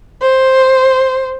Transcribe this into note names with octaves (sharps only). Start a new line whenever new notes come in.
C5